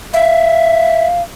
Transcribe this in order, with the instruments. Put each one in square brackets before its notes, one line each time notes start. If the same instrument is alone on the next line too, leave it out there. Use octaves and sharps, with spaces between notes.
[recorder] E5 [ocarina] F5